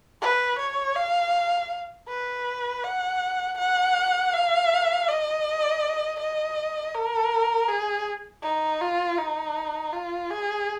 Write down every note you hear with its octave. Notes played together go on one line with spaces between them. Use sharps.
B4
C#5
F5
B4
F#5
F#5
F5
D#5
D#5
A#4
G#4
D#4
F4
D#4
F4
G#4